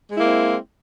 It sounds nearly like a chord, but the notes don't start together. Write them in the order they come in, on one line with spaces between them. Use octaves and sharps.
G#3 E4 A#3 C4